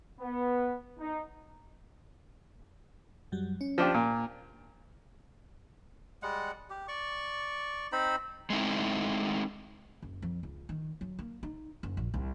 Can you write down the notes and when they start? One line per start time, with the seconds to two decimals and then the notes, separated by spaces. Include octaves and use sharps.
0.20 B3
1.00 D#4
3.32 F#2 F#3 G3
3.61 C#4
3.78 F3 D4 G4
3.94 A#2
6.23 G3 G#3 F#5
6.70 G4
6.88 D5 C#6
7.92 C4 D#4 C5 B5
8.50 G#3 A3 C4 D#4 E4
10.02 F#1
10.22 F2
10.43 C#2
10.69 D#3
11.01 F#3
11.19 A#3
11.43 D#4
11.83 F#1
11.97 A#1
12.14 C2